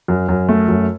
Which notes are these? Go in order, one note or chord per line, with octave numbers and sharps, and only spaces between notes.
F#2
F#2
A3
F#2